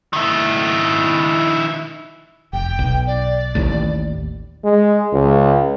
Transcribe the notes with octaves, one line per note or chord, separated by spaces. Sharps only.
D#3 E4
F1 G5
B1
D5
A1 D#2 A2
G#3
C#2